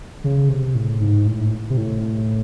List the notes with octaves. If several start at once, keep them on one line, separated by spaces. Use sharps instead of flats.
C#3
C3
A2
G#2
A2
C3
A2